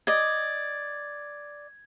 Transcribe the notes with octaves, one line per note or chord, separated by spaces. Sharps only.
D5 D#5 G#6